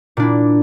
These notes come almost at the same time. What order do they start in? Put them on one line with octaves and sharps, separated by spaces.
A#2 D4 E4